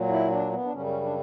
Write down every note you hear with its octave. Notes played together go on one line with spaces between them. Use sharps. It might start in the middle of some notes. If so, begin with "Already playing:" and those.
Already playing: A#2 F#3
E4
D4
B3
D4
F#2 C#3 G3 C#4
C#4
D4